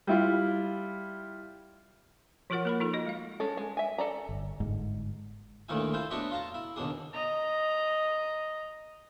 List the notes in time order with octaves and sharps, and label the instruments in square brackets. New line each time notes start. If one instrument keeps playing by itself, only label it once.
[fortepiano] G3 E4 F4
[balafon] F3 F4 F#4 A#4 C#5 F#5
A#3 A#4 B5
D#4 F4 A4
F#4 D#5
G#3 F5
[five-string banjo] G#3 C#4 A4
G#3
E5 G#5
A4 D5 A#5
[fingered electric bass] G1
G1 G#2
[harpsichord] D2 A#2 D#3 E4 G#5
E4 F4 C5
B3 D4 F#4 C#5 D#5 E5
F4 F5 A5 A#5
E4
D#2 B2 D4 G#4
[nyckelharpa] D#5 A#5